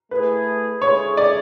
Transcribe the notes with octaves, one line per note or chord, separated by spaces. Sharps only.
A3 E4 G#4 B4
D3 G#3 C#4 E4 G#4 C#5
D5